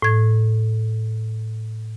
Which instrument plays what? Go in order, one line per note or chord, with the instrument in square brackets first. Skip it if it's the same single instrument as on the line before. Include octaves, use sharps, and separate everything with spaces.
[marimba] A2 G#6